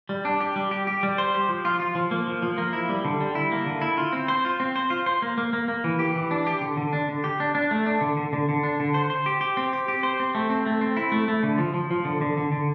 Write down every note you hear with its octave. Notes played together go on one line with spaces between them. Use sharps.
G3
D4
G4
G3
G4
G4
G3
C5
G4
F3
F4
F4
F3
A#3
F3
F3
A#3
E4
G3
D3
G3
E4
A#3
D3
E4
F4
C4
C5
F4
C4
C5
F4
C5
A#3
A#3
A#3
A#3
E3
G4
E3
D4
G4
D3
D3
D4
D3
G4
D4
D4
A3
D4
D3
D3
D3
D3
D4
D3
C5
C5
G4
G4
C4
G4
G4
C5
C4
A3
C4
A3
C4
E4
A3
A3
D3
F3
F3
F3
D3
D3
D3
D3